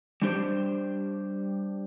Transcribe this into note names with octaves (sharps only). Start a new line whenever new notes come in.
G3 D4 G4 C5